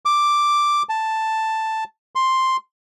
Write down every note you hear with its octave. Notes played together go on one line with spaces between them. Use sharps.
D6
A5
C6